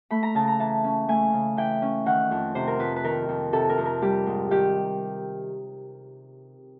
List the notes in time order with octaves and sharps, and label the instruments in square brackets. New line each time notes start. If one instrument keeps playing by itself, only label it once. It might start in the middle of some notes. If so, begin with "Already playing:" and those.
[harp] A3 B5
A#5
C#3 A5
A#5
E3 A5
C#4
A3 G#5
C#3
E3 G5
C#4
D#3 F#5
F2
C3 C5
A#4
F2 B4
B4
D#3 A#4
F2
C3 A4
A#4
F2
A#4
G3 G4
G#2
D#3 G4